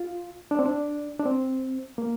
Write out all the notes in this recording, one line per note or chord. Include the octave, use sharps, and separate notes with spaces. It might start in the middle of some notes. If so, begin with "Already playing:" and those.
Already playing: F4
D4
C4
D4
D4
C4
A#3